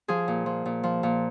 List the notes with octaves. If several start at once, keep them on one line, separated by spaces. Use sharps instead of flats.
F3 G#4
A#2
F3
A#2
F3
A#2